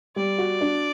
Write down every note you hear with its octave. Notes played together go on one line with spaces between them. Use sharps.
G3 D5
F#4
D4